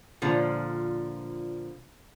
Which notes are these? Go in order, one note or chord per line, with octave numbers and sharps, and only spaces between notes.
A#2 D3 F3